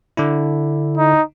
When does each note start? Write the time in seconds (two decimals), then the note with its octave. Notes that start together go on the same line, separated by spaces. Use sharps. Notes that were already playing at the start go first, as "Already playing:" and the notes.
0.17 D3 D4 E4
0.97 D#4